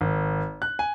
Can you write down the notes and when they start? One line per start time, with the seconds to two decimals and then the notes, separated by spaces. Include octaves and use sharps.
0.01 G#1
0.62 F#6
0.79 G#5